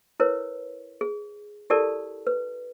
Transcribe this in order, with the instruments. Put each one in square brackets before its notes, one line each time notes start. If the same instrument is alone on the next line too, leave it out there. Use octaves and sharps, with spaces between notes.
[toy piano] E4 A#4 B4 C#5
G#4
E4 G4 A4 A#4 D5 A5
B4